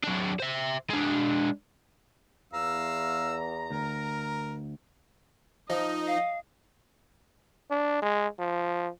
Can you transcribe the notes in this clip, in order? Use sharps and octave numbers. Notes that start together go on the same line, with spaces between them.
F#3 D4
C5 E5
G#3 D4
E2 F5 A#5 E6
D2 A#4
F3 D#4 D#5
F5
D4
G#3
F3